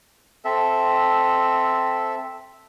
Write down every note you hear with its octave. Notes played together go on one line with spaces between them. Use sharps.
C4 A4 E5